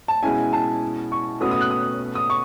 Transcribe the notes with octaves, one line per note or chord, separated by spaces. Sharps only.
A5
B2 G#3 C#4 E4 G#5
A5
C#6
B2 A3 C#4 F#4 B4 D#6
D#6
F#6
D#6
D#6
C#6